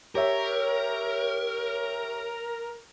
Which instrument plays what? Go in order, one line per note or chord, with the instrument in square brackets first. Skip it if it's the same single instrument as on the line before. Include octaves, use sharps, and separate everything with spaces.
[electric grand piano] G4 C#5 E5 [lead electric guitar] A#4